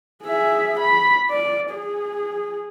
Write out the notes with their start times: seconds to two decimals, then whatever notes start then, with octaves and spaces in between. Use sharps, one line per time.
0.23 G#4 E5
0.80 B5
1.30 D5
1.71 G#4